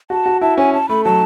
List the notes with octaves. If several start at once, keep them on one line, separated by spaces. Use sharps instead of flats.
F#4 A5
F#4
E4 A5
C#4 G#5
A5
A3 B5
F#3 A5